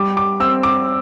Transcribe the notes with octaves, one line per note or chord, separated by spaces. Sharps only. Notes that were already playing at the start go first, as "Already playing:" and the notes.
Already playing: G3 D6
D6
C4 E6
D6